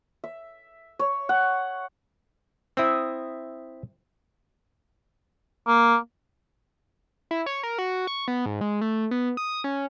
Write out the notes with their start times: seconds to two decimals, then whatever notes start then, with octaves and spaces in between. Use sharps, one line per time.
0.24 E5
0.99 C#5
1.29 F#5
2.77 C4 E4 E5 D#6 E6
5.67 A#3
7.31 E4
7.46 C#5
7.63 A#4
7.78 F#4
8.07 C#6
8.28 B3
8.46 G#2
8.61 G#3
8.81 A3
9.11 B3
9.37 D#6
9.64 C#4